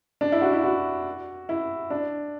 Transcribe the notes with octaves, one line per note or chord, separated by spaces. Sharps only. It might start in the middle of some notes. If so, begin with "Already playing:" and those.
D4
E4
F#4
E4
F#4
E4
D4